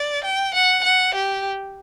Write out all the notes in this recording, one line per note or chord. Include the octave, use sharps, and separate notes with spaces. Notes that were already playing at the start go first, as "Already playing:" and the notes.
Already playing: D5
G5
F#5
F#5
G4